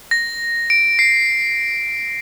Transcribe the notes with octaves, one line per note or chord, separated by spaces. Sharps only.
A#6
D7
C7